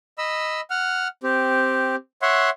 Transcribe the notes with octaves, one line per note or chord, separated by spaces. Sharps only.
D#5 B5 E6
F#5 F6
C4 G4
C#5 E5 F#5 C6